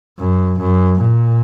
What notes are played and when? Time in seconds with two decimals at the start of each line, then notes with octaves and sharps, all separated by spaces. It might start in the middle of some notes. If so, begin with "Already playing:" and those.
0.19 F#2
0.60 F#2
1.01 A#2